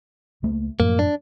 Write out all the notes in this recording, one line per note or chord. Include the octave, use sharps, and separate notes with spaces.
C#2 A3 A#3
F#2 A2 F3 A#3
D4